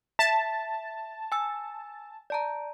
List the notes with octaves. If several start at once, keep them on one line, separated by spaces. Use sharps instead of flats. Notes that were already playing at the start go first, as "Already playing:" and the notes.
E5 A5 B6
G#5 E6
D5 A5 A#5